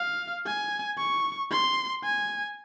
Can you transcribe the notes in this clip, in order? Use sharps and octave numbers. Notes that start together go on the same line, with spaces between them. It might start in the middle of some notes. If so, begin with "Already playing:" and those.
Already playing: F5
G#5
C#6
C6
G#5